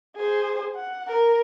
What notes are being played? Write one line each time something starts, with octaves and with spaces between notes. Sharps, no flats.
G#4 C5
F#5
A#4